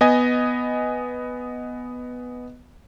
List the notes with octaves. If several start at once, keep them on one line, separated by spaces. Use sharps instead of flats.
B3 D#5 G#5